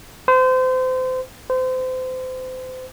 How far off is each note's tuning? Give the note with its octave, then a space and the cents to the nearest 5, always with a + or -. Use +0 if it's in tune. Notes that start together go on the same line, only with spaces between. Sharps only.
C5 -30
C5 -30